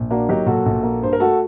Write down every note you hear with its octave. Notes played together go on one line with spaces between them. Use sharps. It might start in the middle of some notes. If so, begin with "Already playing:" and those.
Already playing: A#1
A#3 D4 F#4
F#3 D#4 G4
A#2 F#4 A4
A#1
A#3
G2 C5
A#4
A3 F#4 A4